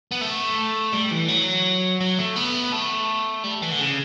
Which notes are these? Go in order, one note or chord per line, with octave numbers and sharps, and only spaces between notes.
B3
A3
G3
E3
F#3
F#3
A3
B3
A3
G3
E3
D3
C#3